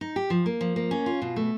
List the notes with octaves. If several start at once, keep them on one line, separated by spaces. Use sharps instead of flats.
D#4
G4
F3
A#3
F3
A#3
C#4
F4
B2
A3